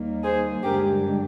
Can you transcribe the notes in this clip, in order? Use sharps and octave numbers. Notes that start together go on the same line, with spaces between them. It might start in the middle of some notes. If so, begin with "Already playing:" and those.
Already playing: D#2 D#3 G3 A#3
G#4 C5
G2 D3 G#3 G4 A#4